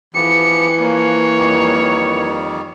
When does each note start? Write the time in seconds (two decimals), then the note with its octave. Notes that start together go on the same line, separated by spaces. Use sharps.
0.15 E3 F3 B3 G4 C#7
0.82 F3 A#3 C#5
1.38 F2 D#3 G3